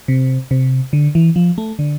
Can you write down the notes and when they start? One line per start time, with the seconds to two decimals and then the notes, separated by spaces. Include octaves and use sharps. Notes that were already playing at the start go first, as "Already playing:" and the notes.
0.08 C3
0.51 C3
0.93 D3
1.15 E3
1.36 F3
1.58 A3
1.79 D3